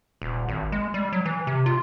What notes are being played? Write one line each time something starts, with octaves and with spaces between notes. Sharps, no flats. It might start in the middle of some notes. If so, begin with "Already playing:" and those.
D#1
G#1
G#3
G3
F#3
E3
C3
F4